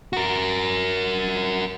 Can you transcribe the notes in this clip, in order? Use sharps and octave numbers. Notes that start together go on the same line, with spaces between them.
F#4 A#4